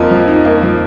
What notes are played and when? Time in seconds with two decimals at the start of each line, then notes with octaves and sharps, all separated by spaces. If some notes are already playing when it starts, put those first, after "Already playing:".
Already playing: F2 F3 A#3 A#4 D#5
0.11 F3
0.28 D#4
0.45 A#3
0.63 F3